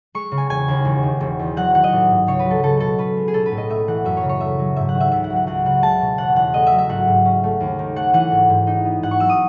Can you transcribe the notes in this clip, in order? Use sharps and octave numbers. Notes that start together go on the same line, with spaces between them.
G#3 C#6
C#3
G#5
E1 G#5
D#2
E1
D#3
E1
E2
F#3 F#5
D#3 F#5
D#5
A1
G#2
C#2 C#5
B4
F#3
A4
C#2 A4
B2 A4
C#4 B4
G#3
G#4
B1 A4
B4
A2
D#5
A3 E5
E3 F#5
F#2 E5
C#5
C#3
C#5
A3 E5
F#3
G#2 E5
F#5
D#3
E5
C#2 E5
F#5
F#3
F#5
C#2 F#5
C#3 F#5
G#3 A5
B2
E1 F#5
E2 F#5
A3 D#5
E5
F#3
E5
G#1 F#5
G#2
C#4
A3
D#2
D#3
A3 F#5
E3 F#5
G#1
G#2
D#4
B3
G#2 F#5
C#6
F#3 E6
D#6